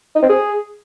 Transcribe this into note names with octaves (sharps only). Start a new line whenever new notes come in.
D#4
C4
G#4